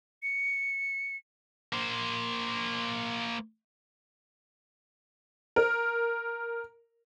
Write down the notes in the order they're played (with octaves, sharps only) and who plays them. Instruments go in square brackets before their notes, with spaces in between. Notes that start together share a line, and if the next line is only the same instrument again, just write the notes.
[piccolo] C#7
[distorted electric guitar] A#3 C5
[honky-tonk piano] A#4